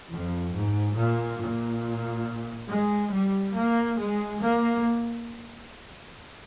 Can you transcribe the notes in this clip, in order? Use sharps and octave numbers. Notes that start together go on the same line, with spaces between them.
F2
G#2
A#2
A#2
G#3
G3
A#3
G#3
A#3